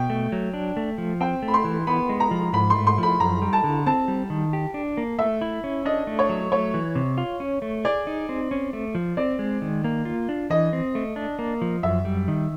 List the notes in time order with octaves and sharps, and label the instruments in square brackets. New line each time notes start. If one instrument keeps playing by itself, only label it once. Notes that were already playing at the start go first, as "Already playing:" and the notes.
Already playing: [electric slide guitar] B2 [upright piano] G5
[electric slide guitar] A3
F#3
D4
A3
F3
[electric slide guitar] C4 [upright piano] G5
[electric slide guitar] A3
[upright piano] B5
C6
[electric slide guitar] E3
[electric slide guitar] B3 [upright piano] B5
[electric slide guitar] G#3
[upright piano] A#5
[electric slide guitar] F3
[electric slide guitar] G#2 [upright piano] B5
[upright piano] C6
[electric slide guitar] A3
[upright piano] C6
[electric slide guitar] F3 [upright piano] B5
[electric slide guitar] F#2 [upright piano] A#5
[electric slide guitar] G3
[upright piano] A5
[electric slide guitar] D3
[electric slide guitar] C4 [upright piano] A5
[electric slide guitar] G3
D#3
G4
D4
A#3
[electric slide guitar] A3 [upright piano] E5
[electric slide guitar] E4
C#4
[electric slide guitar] D4 [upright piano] D#5
[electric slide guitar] A3
[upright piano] C#5
[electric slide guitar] F#3
[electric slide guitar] A3 [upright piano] C#5
[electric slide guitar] E3
C3
F4
C#4
A3
[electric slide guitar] G#4 [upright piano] D5
[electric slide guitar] D#4
C4
C#4
A3
F3
[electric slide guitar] C4 [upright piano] D5
[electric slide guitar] G#3
D#3
A#3
F4
D4
[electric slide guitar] E3 [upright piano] D#5
[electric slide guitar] C4
A3
D4
A#3
F3
[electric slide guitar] F#2 [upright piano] E5
[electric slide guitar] G3
D#3